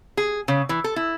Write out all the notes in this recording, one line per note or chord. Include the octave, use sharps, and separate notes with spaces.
G#4
C#3
E3
A4
E4